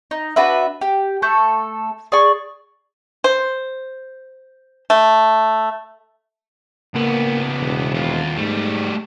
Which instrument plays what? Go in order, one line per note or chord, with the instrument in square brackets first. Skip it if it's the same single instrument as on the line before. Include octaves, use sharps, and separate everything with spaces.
[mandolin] D#4
D4 F#4 B4 E5
G4
A3 A4 G6
G#4 D5 C#6
[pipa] C5
A3
[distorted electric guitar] C#2 B3 [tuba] A#3
[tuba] E1
[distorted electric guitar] D#2 F4
[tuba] G#2 [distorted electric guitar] G3 A3